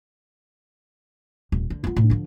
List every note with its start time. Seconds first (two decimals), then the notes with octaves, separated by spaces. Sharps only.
1.52 D#1
1.70 D3
1.84 B3 F4
1.96 A2
2.10 D3 F3